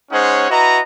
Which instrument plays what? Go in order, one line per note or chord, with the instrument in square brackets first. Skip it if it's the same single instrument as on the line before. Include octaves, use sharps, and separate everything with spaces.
[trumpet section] G#3 C#4 D#4 C5 C#5 F#5
E4 F#4 B4 D#5 A#5